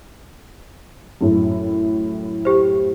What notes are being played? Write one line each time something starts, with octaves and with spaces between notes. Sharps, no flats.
F#2 A2
G4 C5